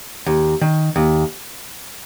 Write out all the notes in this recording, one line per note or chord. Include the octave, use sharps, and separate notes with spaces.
D#2
D#3
D#2